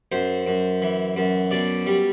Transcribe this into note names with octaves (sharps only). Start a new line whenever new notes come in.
F#2 C5
F#2
E3
F#2
B2 D5
G3